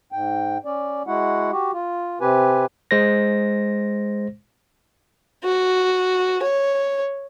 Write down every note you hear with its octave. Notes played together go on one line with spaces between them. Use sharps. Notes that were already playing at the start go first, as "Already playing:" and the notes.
G#2 G5
C#4 D5
G#3 E4 F#4 F#5
F#4 G4
F4
C3 C4 G4 B4 G#5
G#3 C5 A#6
F#4
C#5